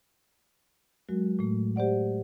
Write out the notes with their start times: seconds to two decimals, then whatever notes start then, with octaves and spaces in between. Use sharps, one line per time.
1.09 F#3 G#3 F#4 A#4
1.39 A2 A3
1.76 G4 C5 D5 F#5